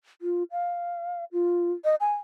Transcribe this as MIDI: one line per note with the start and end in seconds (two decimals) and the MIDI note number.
0.22 0.43 65
0.51 1.24 77
1.32 1.72 65
1.85 1.95 75
2.01 2.14 80